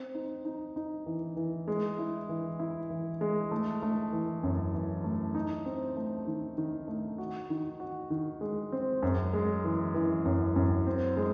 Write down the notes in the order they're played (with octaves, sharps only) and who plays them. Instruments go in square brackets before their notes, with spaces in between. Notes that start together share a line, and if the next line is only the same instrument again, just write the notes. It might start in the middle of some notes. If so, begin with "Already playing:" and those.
Already playing: [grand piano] C4
D#4
D#4
D#4
E3
E3
G#3
E4
E3
E4
E3
G#3
A3
A3
E3
F#2
E3
A3
D#4
C4
A3
D#3
D#3
A3
F#4
D#3
F#4
D#3
G#3
C4
F#2
G#3
E3
E3
F#2
F#2
C4
G#3